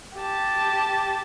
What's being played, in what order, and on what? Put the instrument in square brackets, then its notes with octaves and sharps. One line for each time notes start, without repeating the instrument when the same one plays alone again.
[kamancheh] G4 A5